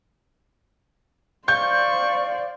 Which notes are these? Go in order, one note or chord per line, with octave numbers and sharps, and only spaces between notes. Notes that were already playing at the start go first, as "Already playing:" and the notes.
C5 D5 F5 C#6 G6